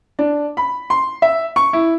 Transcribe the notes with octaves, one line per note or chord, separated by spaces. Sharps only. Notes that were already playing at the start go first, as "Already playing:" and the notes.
D4
B5
C6
E5
C#6
E4